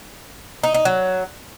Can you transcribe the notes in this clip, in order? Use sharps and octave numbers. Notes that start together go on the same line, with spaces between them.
D#4
D#4
F#3